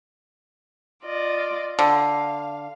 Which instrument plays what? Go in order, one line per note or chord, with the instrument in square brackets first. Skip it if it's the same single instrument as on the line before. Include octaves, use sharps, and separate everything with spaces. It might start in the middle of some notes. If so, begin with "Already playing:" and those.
[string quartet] F4 D5 D#5
[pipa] D3 [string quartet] F5